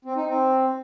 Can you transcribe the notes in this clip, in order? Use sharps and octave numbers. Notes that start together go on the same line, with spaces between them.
C4
D#4
C4